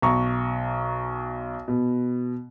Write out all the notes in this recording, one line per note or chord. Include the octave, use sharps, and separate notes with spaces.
B1 A#5 C#6
B2